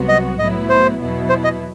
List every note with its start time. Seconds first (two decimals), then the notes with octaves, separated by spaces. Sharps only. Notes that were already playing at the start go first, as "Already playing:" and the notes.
Already playing: C2 C3 F#3 B3 F#4
0.09 D#5
0.39 A2 F#3 B3 E4 D#5
0.69 C5
0.99 E2 B2 F#3 B3 E4
1.29 C5
1.44 D#5